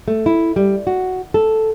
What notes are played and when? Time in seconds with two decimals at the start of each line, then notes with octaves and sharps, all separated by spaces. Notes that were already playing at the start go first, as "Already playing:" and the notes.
0.08 A3
0.26 E4
0.56 G3
0.87 F#4
1.34 A4